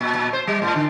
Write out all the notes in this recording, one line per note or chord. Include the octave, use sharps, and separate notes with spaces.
A#2
A#2
C5
G3
A2
D3